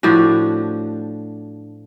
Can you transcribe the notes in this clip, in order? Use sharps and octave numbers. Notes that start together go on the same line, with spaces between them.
A2 F3 D4 F#4